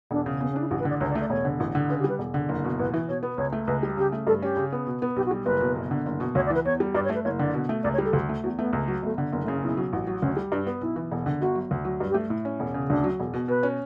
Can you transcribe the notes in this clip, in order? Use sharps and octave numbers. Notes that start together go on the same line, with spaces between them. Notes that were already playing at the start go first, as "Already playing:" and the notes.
E1 D4
C#3
C#3 B3
C#4
D4 E4
A1 G4
B4
D3 D5
C#2 C#5
D5
A3
D5
E1 C#5
D3
A1
D3
C#3 B4
G4
G3 B4
E1
D3
F#1
B2
A1 B4
E3
B2 C#5
B3
C#2 C#5
A3
C#2 B4
G3
C#3 G4
A3
G2 A4
C#4 G4
C#3
B3
B2
B3
B1 G4
F#4
G3
F#1 B4
B2
G1
D3
F#1
B2
D2 C#5
D5
E3 B4
E2 C#5
G3
G2 D5
C#5
A3
B4
F#1 C#5
D3 D5
B2
A3
C#2 D5
C#5
G3
A4
D2
A3
E2 F#4
A3 B3
C#2
F#3
G1 A3
D3
F#1 B3
A3
C#3 C#4
B1 E4
F#3
A1
F#3
D2 C#4
G3
G2 D4
B3
B1 E4
E3
E1
D3
G1 F#4
F#3
D2
F#3
G2
G4
A3
A2
C#4
E1
C#3
D2 D4
F#3
E1
B2
B2 B4
C#4